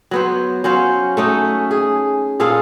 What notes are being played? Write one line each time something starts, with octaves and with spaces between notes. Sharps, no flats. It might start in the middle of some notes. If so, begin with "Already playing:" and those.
F#3 B3 C5
F#3 C#4 C5 F5
A3 C#4 D#4
G#4
A#2 G#4 A4 F5